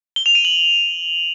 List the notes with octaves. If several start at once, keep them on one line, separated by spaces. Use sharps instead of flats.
G7
F7
D#7
F#7